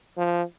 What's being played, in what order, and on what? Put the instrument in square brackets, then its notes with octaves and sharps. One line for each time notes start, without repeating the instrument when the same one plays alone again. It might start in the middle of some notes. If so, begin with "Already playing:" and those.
[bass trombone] F3